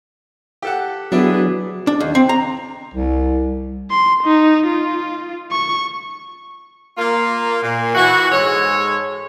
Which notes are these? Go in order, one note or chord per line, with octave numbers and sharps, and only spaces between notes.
G4 A4 F#5
F#3 B3 D4 E4 G#4
D4
D#2
C4
A#5
C2
C6
D#4
F4
C#6
A#3 F4
A#2
E3 F#4
G#2 G#3 A4 C#5